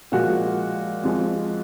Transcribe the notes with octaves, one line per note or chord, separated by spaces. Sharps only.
A#2 F3 G#3 F#4
F2 F3 G#3